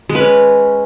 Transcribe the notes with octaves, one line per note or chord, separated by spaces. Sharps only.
G#3
B4
C#4